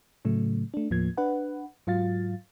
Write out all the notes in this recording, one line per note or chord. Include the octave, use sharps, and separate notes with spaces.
A2 C#3 F#3 A3
A3 D4
D#2 A2 F3 A#3 G#6
D4 B4 F#5
G#2 F#3 F4 F5 A6